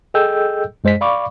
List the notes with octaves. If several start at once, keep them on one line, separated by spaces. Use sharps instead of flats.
G#4 A4 D#5 G5 E6 G6
F#2 G#3 C5 D#5 B6
D5 F5 B5 C#6 D6